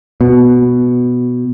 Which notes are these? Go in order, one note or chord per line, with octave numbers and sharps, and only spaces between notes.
B2